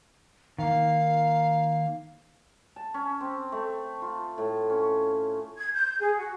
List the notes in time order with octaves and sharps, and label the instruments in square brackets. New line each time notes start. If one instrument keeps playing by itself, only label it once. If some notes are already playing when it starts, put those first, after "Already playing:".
[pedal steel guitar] D#3 A#3 [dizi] F5
[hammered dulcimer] A5
C#4
C4
A3
F4
A2
C#4
[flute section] G#6
G6
G#4
F#4